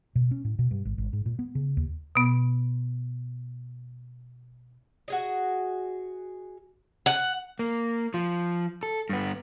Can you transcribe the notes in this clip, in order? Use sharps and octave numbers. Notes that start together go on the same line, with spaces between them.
B2
C#4
A2
B2
G2
G#1
G#1
G#2
A#2
B3
C#3
D#2
B2 B3
F#4 G#4 D#5
F#5
A#3
F3
A4
G2 B3